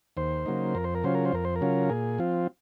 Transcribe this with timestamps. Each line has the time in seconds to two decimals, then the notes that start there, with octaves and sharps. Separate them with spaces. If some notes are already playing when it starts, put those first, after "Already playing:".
0.17 D#2 C5
0.46 C#3 F#3 A#3 D#4
0.75 F2 A#4
0.84 C5
0.95 A#4
1.04 C#3 F#3 C#4 F4 C5
1.15 A#4
1.25 C5
1.32 F2 A#4
1.45 C5
1.56 A#4
1.61 C#3 F#3 C#4 F4
1.89 A#2 G#4
2.19 F3 C4 F4